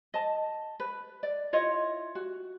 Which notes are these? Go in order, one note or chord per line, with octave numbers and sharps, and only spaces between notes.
D#5 A5
B4
D5
E4 F4 C#5 D#5
F#4